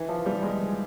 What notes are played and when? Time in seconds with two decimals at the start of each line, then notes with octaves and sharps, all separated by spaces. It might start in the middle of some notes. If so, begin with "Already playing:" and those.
Already playing: E3
0.09 F3
0.26 G3
0.43 G#3